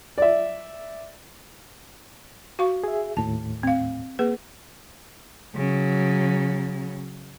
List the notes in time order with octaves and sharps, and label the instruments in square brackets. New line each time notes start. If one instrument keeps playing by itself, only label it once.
[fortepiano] D5 E5
[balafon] F#4 F5 C#6
[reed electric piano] G#4 E5
[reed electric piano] D#2 A2 [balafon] A5
[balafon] C4 F5
A#3 G#4 B4
[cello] C#3 F#3